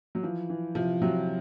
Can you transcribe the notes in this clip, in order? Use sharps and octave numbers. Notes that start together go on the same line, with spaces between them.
F#3
E3 F3
E3
C3 F3
C3 F#3